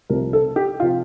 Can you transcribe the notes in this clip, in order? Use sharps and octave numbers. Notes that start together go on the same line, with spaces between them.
C2 C3 F3 A#4
A4
G4
C3 F3 F4